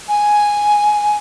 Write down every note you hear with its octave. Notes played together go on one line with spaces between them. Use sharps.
G#5